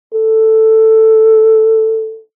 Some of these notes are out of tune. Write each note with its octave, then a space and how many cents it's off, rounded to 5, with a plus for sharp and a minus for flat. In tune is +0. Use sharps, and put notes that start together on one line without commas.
A4 +5